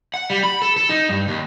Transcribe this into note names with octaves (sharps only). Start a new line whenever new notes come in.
F#5
G3
B5
A4
A4
D#4
G2
D#2